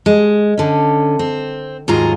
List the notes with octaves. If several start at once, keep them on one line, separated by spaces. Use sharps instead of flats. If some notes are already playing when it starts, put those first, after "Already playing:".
G#3
D3 C#4
C4
D#2 G#2 F#3 F4 G#4 A#5